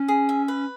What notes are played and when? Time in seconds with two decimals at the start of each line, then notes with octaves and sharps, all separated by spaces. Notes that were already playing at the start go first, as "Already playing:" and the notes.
Already playing: C#4
0.08 G#4
0.29 E5
0.48 B4